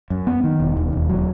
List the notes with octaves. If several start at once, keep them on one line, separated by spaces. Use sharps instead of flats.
F#2
B3
D#3
E1
D#2
E1
F#3